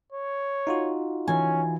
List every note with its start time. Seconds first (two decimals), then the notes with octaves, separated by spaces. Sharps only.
0.13 C#5
0.67 D#4 F4 F#4
1.28 E3 C#4 G#5